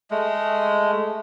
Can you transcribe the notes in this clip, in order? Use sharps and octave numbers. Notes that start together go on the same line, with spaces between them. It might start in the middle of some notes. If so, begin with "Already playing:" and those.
G#3 A3